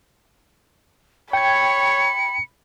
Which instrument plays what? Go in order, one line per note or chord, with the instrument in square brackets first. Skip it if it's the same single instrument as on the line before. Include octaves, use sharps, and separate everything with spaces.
[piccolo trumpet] C#5 [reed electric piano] G5 G#6 [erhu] B5 [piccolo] C#7